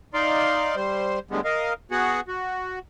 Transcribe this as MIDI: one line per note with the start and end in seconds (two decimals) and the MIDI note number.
0.14 0.75 63
0.14 0.75 74
0.14 0.75 77
0.14 0.75 84
0.76 1.19 55
0.76 1.19 72
1.31 1.41 45
1.31 1.41 50
1.31 1.41 55
1.31 1.41 56
1.31 1.41 59
1.45 1.73 70
1.45 1.73 75
1.45 1.73 77
1.91 2.20 59
1.91 2.20 66
1.91 2.20 68
1.91 2.20 78
2.28 2.79 66